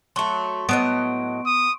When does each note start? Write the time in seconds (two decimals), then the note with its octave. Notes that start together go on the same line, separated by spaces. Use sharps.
0.16 F#3 A3 C6 C#6
0.69 A2 F#3 B3 D#5 D7
1.46 D#6